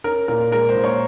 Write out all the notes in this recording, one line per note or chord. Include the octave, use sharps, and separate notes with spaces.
C#4 A#4
A#2 A#4
G#3 A#4
C5
A#2
C#5